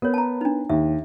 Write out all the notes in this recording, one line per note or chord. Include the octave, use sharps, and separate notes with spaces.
B3 A#4 C#5
A5 A#5
D4 D#4
D#2 E5